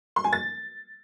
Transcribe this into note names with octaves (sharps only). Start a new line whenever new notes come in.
C6
G#5
A6